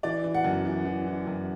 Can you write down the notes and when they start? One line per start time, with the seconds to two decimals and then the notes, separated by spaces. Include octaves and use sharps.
0.03 E3 D5
0.24 E3
0.34 F#5
0.44 F#2
0.65 E3
0.85 E3
1.07 E3
1.27 F#2